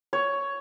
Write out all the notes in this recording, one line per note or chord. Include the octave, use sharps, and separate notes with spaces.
C#5